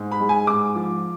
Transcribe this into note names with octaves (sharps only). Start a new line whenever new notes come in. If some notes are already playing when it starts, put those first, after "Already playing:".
Already playing: G#2
B5
G#3
G#5
G#2 D6
F3